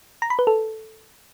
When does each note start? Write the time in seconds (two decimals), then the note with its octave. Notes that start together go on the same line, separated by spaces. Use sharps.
0.22 A#5
0.30 B5
0.39 B4
0.47 A4